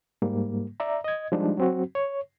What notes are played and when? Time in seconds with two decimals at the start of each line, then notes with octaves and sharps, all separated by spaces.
0.22 G#2 G3 A#3
0.80 D5 E5 A#5
1.04 D#5 G#6
1.32 F3 G3 G#3 D4 D#4
1.57 F#3 C4 F#4
1.95 C#5